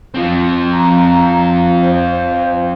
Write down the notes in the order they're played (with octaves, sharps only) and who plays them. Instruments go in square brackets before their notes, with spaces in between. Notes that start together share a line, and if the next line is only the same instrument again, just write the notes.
[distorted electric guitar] F3 C4
[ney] A#5
C5